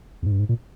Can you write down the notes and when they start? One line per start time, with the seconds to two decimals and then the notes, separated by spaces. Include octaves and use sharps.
0.22 E2
0.26 G#2
0.32 G2
0.39 G#2
0.49 A#2